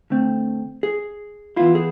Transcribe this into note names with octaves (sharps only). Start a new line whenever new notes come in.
D3 A3 C4
G#4
E3 B3 E4 F4
G#4